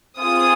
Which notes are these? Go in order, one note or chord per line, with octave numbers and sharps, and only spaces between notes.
C4 F4 G#4 D#6